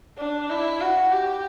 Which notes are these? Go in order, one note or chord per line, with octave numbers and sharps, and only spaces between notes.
D4
E4
F#4
G4